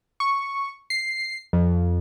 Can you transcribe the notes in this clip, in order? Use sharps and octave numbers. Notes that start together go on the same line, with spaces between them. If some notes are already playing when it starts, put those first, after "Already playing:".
C#6
C7
F2